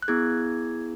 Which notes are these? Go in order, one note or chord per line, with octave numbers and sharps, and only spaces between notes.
F#6
B3 E4 G#4 G#6